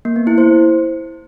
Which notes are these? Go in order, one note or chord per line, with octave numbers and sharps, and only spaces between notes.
A#3
B3
E4
C5